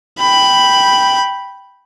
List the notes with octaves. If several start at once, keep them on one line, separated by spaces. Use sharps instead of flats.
G5 B5